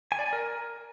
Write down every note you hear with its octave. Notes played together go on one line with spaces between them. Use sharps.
G#5
D5
G#5
A#4